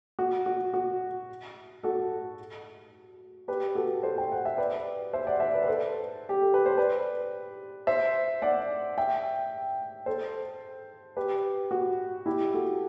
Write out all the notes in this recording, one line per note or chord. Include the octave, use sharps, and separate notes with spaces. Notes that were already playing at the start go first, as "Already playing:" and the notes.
F#4
F#4
F#4
F#4 A4
G4 B4
F#4 A4
A4 C5
G5
F#5
E5
B4 D5
C5 E5
D5 F#5
C5 E5
B4 D5
B4
A4 C5
G4
A4
B4
C5
B4 D5
C5 E5
D5 F#5
E5 G5
A4 C5
G4 B4
F#4
E4 G4
F#4 A4